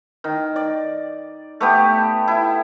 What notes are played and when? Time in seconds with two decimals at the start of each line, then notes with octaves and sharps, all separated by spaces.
0.24 D#3
0.56 D5
1.60 A3 B3 G4
2.28 E4